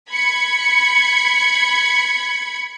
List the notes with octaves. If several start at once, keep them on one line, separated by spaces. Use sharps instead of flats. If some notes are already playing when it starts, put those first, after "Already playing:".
B5 G#6 C#7